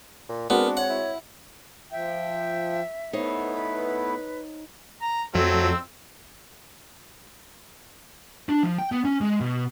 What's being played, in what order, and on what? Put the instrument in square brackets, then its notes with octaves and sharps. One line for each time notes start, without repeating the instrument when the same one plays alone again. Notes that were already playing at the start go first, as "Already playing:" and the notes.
[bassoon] A#2
[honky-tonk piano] G#3 C4 F#4 [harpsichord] B3 [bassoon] D4 [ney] A#4
[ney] C#5 [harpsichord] F#5
[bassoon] E4
[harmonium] F3 G5 [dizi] E5
[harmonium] A3 B3 E4 [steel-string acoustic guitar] D#4 C5 C#5
[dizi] B4
[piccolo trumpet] A#5
[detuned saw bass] F2 [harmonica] F#3 A3 [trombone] C4 [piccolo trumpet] E6
[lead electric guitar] D4
F3
G5
B3
C#4
G#3
B2